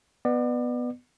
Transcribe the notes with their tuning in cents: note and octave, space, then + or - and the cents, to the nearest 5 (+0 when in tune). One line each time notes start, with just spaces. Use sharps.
B3 +0 D5 +35